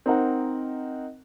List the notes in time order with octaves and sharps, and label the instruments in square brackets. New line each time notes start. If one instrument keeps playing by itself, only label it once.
[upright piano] C4 D#4 A#4 F#5